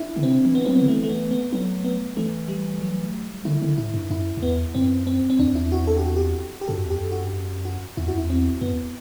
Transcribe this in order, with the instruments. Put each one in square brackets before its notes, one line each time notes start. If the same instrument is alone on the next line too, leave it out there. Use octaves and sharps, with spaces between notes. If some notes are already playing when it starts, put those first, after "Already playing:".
Already playing: [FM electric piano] D4 E4
[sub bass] D3
[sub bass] C3 [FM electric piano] C4
[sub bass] E3
[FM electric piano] B3
[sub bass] F#3 [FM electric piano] C4
[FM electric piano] B3
[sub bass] D3
[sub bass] E3 [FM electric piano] A3
[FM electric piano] A3
B3
B3
[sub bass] F#3 [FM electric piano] B3
[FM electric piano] B3
[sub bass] E3 [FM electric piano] A3
[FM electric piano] G3
F#3
[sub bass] D3 [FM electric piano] E4
[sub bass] D3
[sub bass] A2 [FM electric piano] E4
[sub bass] G2
[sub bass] F#2 [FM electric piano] E4
[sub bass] F#2
[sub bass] E2 [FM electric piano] B3
[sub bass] F#2 [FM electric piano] C4
[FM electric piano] C4
C4
[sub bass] E2 [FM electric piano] D4
[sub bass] F#2
[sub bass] E2 [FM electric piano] E4
[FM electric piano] F#4
A4
G4
F#4
G4
G4
[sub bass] G2 [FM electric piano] A4
[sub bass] F#2
E2
[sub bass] F#2 [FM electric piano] G4
[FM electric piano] F#4
[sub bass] G2
F#2
[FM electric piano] F#4
[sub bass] E2 [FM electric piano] E4
[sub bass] F#2 [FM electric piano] F#4
[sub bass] E2 [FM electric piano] E4
[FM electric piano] C4
[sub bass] F#2 [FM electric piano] B3
[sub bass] E2